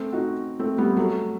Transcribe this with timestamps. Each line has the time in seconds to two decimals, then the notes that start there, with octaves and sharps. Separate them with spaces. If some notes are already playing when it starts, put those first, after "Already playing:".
Already playing: A3 C4
0.13 D#4 F#4
0.59 A3 C4
0.78 G3 B3
0.96 F#3 A3